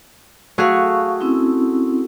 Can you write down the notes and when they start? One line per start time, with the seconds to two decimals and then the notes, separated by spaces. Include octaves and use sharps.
0.58 A3 F#4 G#4 F5 C#6
1.21 C4 C#4 E4